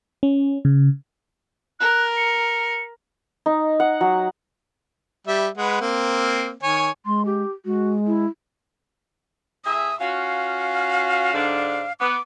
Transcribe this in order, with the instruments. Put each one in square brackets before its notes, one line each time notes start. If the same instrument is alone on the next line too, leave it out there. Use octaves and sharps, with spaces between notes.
[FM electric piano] C#4
C#3
[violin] A#4 [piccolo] F#6
[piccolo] C#7
[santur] D#4
F#5
F#3
[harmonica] G3 E5
G#3 B4 F#5
A#3 C4
D#3 C#5 G#5
[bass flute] G#3 [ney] C6
[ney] G4
[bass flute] G#3 [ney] F#4
[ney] E4
[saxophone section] A2 G#4 E5 [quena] D#6
[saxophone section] C#4 F4 F#4 [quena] F5
[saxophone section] G#2 D3 D4
[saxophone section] B3 [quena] D6